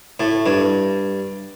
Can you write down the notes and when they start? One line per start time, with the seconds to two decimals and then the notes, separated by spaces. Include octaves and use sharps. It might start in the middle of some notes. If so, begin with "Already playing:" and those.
0.20 A2
0.46 G2